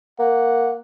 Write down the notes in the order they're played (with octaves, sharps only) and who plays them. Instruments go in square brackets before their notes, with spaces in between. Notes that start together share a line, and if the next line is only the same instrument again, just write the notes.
[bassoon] A#3 [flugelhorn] F#5